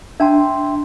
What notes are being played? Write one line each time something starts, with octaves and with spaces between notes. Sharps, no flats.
D4 E5 G5 A5 A#5 C6